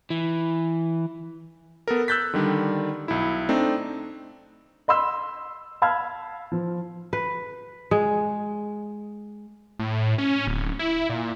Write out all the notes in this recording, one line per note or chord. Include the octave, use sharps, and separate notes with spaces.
E3
B3 A4 A#4
E6 F#6 G6 A6 B6
D3 D#3 G3
B1 E4
A3 C4 D4 D#4
D#5 B5 C6 E6
F5 A5 B5 E6 F6 G#6
F3
B4
G#3
A2
C#4
D1
E4
A#2